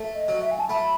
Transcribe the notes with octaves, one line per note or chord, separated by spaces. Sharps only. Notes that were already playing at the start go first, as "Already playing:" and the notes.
Already playing: A3
D#5
F#3
E5
G#5
A5
A3 B5